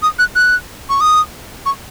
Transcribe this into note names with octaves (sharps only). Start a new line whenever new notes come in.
D#6
F#6
F#6
C#6
D#6
C#6